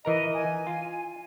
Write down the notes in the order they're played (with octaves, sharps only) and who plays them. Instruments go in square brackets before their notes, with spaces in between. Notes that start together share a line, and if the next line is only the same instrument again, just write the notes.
[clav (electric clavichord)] E3 A#4 A#5 [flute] D#5
[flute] G#5
[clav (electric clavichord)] F4